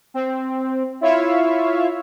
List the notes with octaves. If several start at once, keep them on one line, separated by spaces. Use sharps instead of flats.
C4
E4 F4 C#5 E5 F5